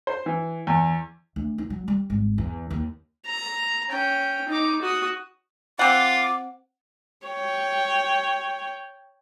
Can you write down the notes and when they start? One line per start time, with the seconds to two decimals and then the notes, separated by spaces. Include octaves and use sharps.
0.07 C5
0.26 E3
0.67 E2
1.36 D2
1.58 D#4
1.70 F#3
1.88 G3
2.10 G#1
2.38 E2
2.70 D#2
3.26 A#5
3.90 C#4 G5
4.48 D#4 D6
4.82 F#4 D#6
5.79 C4 F4 F#5 D6
7.27 C#5 G5